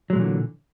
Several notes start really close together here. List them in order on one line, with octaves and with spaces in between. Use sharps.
F#3 G#3 A#2 E3 D3